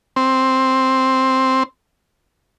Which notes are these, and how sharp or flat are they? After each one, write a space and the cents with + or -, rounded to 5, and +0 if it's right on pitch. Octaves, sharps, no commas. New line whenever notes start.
C4 +5